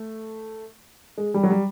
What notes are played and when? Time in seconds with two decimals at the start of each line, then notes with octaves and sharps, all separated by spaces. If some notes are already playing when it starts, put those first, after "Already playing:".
Already playing: A3
1.18 G#3
1.34 G3
1.43 F#3
1.50 G3